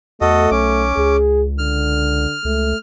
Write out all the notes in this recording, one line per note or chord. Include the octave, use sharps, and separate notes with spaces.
E2 A3 F#4 A4 D#5
B1 C#4 D6
C#2 G#4
D3 F6
C#2 A3